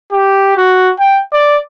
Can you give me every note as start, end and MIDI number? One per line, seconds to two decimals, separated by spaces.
0.12 0.52 67
0.57 0.91 66
0.99 1.21 79
1.33 1.57 74